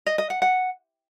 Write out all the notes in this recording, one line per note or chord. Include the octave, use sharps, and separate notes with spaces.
D#5
D#5
F#5
F#5